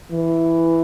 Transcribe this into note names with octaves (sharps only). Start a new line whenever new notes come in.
E3